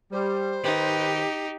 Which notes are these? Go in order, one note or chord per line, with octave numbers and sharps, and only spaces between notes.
G3 C5
D#3 D#4 G4 B4